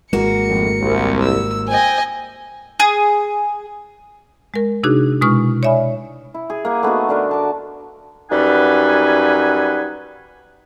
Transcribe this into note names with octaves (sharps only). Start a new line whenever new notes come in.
G#1 G#3 A#3 F#4 C#7
F2 A2
C2
E6
C5 D#5 G5 G#5
G#4
G#3 A#4
C3 D4 D#4 F#4 G#4 F#6
B2 G#3 E4 C#6 D#6 F6
C#5 D5 E5 G#5 B5
E4
G#4
A#3 F#5
A3 B3 D#4 F#4
D3 D4 A#4
A5 D6
F#2 G3 D#4 B4 F#5 G#5